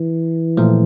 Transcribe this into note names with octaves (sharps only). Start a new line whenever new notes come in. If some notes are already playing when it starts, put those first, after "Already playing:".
Already playing: E3
A#2 F3 A3